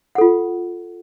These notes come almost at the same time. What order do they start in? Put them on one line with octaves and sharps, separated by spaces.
F#5 A4 F4